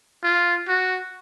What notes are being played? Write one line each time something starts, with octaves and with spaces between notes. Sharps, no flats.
F4
F#4